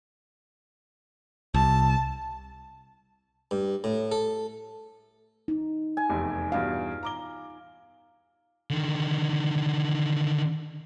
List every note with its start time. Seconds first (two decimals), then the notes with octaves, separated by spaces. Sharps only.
1.54 C2 A5
3.51 G2
3.84 A2
4.12 A4
5.48 D#4
5.97 G#5
6.09 F1 E2
6.52 E2 G2 B2 F5
7.03 A#5 D6 G7
8.70 D3 D#3